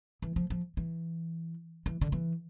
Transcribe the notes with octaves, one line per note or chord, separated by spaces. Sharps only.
E3
F3
F3
E3
E3
D3
E3